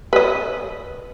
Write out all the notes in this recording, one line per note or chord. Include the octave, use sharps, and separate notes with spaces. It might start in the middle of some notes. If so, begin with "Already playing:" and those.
B4 D#5